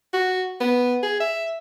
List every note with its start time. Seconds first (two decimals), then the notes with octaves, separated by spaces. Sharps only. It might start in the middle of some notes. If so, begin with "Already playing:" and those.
0.13 F#4
0.61 B3
1.03 G#4
1.20 E5